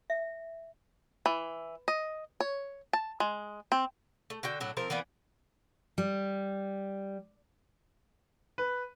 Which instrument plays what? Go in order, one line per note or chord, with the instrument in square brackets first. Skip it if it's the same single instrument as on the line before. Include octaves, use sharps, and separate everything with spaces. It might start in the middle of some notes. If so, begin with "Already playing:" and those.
[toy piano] E5
[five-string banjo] E3
D#5
C#5
A5
G#3
C4
[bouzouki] A3
D3 F#4 G5
A2 F#3 D4
F3 C4 A#4
E3 A#3 B3 D5
[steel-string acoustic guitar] G3
[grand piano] B4